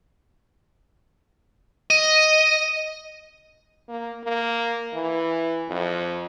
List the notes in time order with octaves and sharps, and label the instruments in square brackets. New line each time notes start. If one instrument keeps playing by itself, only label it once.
[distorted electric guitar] D#5
[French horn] A#3
A#3
E3
F2